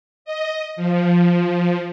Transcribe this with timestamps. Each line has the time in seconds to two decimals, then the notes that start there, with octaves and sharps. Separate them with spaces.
0.25 D#5
0.76 F3